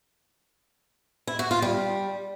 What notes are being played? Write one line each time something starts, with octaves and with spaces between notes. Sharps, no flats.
E4
F#4
F4
G3